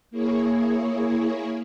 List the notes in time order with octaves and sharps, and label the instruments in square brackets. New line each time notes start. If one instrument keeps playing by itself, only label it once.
[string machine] A#3 E4 G#4 C#5